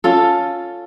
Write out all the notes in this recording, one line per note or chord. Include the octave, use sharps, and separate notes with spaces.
C#4 F4 A4